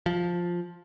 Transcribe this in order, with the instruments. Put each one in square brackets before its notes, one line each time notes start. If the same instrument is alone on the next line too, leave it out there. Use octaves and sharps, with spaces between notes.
[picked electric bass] F3